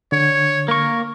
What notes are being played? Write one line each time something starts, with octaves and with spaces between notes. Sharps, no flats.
D3 C#5
A#3 A#4 C#6